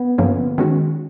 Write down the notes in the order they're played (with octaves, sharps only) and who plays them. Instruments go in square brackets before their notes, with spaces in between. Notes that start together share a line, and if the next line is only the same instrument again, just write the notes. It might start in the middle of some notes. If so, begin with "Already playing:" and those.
Already playing: [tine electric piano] B3
[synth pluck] G2 D3 F3 A#3 C#4
D#3 G#3 C#4 F#4